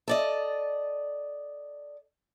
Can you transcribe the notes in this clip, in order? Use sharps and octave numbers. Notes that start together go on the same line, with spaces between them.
A4 D5 D#5